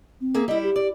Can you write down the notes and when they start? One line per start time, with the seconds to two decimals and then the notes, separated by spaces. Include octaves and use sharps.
0.21 C4
0.34 A#3 G#4 E5
0.48 G3 E4 D#5
0.64 G4
0.76 D5